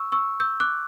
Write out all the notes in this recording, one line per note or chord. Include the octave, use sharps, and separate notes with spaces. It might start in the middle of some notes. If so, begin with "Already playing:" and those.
Already playing: C#6 E6
C#6 E6
E6 G6
D6 F#6